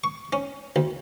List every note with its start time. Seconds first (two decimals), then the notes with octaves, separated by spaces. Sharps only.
0.04 C#6
0.33 C#4
0.76 D2